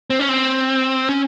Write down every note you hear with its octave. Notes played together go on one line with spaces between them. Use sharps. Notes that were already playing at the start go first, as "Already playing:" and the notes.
C4
C#4
C4
C#4